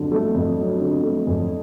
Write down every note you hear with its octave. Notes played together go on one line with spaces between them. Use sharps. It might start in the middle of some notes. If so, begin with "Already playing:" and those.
Already playing: F2 D3 F#3
A3
F2
F#3
D3
A3
F2